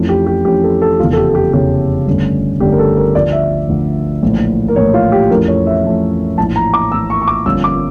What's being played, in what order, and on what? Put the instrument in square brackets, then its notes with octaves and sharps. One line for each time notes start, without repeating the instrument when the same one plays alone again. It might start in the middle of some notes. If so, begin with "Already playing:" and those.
Already playing: [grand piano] F2 E3 A3 C#4
G4
G4
F2 E3 A3 C#4 G4
A4
A4
F1 E2 C#3 F4
A4
G4
A4
G4
F1 E2 C#3 G4
G1 G2 D3 A3 C#4
G1 G2 D3 A3 C#4 G4
A#4
A4
A#4
D2 D3 F3 D5
E5
D2 D3 F3
A#1 A2 E3 A3
A#4
A#1 A2 E3 A3 C#5
F4
G4
F2 E3 A3 C#4 A#4
C#5
E5
F2 E3 A3 C#4
A#1 A2 E3 A5
A#5
D6
A#1 A2 E3 E6
C#6
C#6
D6
G1 G2 F3 A#3 C#4 E6
D6